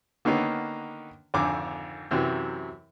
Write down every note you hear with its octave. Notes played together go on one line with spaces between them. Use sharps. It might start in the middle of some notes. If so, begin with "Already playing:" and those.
D3 D#3 A#3 B3 C#4 D#4
G#1 F2 D3 G#5 D6
F#2 C3 E3 F#3